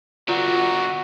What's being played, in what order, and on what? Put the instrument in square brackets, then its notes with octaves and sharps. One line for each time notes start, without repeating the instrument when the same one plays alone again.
[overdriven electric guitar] D3 B3 [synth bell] F4 A#5 [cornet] F#4